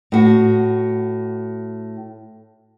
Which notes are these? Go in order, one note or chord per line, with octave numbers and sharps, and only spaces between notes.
A2 F#4